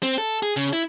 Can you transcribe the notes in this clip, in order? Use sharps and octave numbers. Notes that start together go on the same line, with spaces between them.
C4
A4
G#4
C#3
E4